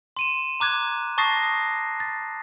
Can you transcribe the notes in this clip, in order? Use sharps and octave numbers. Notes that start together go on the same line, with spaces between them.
C6 D#7 E7
A#5 D6 F#6 G#6
A5 C#6 D#6 A6 A#6 C7
A6